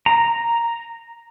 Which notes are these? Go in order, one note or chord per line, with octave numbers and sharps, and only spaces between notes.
A#5